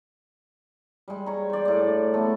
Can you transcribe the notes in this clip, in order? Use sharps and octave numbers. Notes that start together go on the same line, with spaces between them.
G3 G#3
C#5 A#5
C5 D5
A2 D5
A3 B3